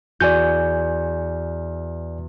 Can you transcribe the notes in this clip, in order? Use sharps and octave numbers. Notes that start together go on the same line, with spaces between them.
E2 F#4 D5 G#5 G6 D#7